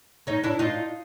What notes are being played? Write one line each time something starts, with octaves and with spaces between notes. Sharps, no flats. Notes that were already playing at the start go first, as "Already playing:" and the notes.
C#4 D#4
D4 E4
D#4 F4